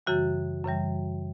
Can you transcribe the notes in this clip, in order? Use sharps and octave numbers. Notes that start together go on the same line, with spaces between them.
F#2 C#3 E3 G3 F#4
F#2 C#3 E3 G3